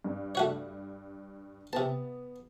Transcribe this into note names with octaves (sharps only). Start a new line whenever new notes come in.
G2
A3 F#4 C#5
C3 B3 A5